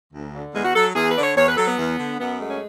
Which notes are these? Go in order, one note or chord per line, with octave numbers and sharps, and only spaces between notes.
D2
D3
E2 G#3
F#4
F#3 A4
E2 G#4
B4
D3 D5
C#5
E2 C#5
B4
F#3 A4
B3
E2
D3
F#2 B3
G#3 A3
C#4